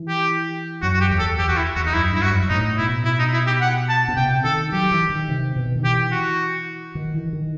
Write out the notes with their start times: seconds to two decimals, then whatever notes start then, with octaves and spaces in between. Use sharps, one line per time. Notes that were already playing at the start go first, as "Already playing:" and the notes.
Already playing: E3
0.08 G4
0.82 F#2 F#4
0.94 F#4
1.01 G4
1.11 E2
1.20 A4
1.39 E2 G4
1.49 F#4
1.57 E4
1.75 E2 F#4
1.86 D#4
1.94 F#2 E4
2.12 G2 E4
2.22 F#4
2.31 F#2
2.49 A2 D#4
2.78 B2 E4
3.05 E4
3.19 D#4
3.33 E4
3.47 G4
3.61 F#5
3.89 A5
4.08 B2
4.17 C3 G5
4.44 D#3 A4
4.72 F#3 G4
4.91 E3
5.10 D#3
5.29 C3
5.56 B2
5.75 D#3
5.84 E3 G4
6.12 F#4
6.95 D#3
7.14 E3
7.33 D#3